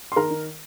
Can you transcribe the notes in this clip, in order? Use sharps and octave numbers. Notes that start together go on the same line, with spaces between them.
C6
D#3 A#4 A#5
D#3